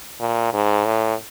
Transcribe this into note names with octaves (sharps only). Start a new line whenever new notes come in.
A#2
G#2
A2